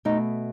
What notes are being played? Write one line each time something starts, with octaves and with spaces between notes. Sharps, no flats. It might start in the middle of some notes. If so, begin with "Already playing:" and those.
B2 A3 D#4